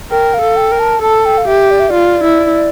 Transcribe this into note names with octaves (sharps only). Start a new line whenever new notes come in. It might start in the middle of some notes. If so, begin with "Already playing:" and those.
A#4 G5
F5
A4
G5
A#4
A5
A4 A5
G5
F5
G4 E5
D5
E5
F4 D5
E4